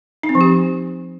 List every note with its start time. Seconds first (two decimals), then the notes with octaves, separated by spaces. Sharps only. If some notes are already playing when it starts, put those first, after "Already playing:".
0.23 D#4
0.29 C4
0.35 F3
0.41 G4